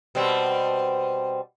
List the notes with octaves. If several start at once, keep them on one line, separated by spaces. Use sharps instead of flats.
B2 G3 C4